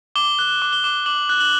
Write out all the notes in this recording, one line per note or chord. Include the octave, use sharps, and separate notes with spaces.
D6 G7
F#6 G7
D6
G7
D6
D6 F#7
F#6
F#7